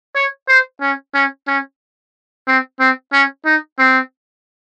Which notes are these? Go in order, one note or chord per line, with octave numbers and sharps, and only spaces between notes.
C#5
C5
C#4
C#4
C#4
C4
C4
C#4
D#4
C4